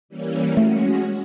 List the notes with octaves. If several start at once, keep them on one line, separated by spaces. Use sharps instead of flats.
E3 G3 A#3 C#4
G#3 A3 C#4 F#4